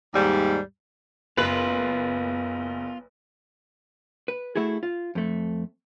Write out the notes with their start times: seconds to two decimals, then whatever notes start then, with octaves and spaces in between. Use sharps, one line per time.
0.14 D#2 G#2 G3
1.37 F#1 B3 F4 B4 F#7
4.28 B4
4.56 A3 E4 F#4 G#4
4.83 F4
5.15 F2 A3